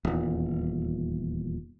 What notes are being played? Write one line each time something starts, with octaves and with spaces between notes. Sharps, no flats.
D#1 E2